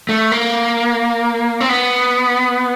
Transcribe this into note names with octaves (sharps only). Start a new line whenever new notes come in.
A3
A#3
C4
B3